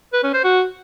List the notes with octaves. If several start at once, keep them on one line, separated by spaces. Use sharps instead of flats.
B4
C#4
C5
F#4